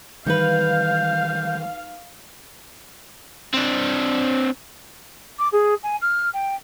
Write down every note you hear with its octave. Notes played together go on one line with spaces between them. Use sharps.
D#3 E3 G3 D#4 B4 F5 G6
C4 D4
D6
G#4
G#5
F6
G5